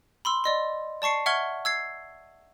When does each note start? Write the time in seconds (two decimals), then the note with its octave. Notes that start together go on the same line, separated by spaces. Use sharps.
0.25 B5 C6 E6
0.44 D5 D#5 C6
1.02 D5 A5 C#6 C7 C#7
1.26 E5 F#5 C#6 F6 G#6 G7
1.65 E6 G#6 C7